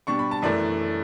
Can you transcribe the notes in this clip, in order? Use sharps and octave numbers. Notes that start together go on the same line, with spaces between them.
B2 G3 D4 C#6
B5
A5
F#2 E3 A3 D5